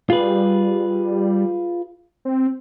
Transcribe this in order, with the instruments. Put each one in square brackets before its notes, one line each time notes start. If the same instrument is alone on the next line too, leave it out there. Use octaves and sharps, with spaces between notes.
[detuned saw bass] G3 [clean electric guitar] F4 G#4 B4
[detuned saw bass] C4